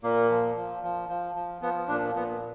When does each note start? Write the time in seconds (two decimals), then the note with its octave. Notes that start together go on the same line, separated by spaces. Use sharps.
0.03 A#2 A#3
0.30 F3
0.56 F3
0.83 F3
1.09 F3
1.35 F3
1.62 F3 B3
1.88 A#2 D4
2.15 A#2 B3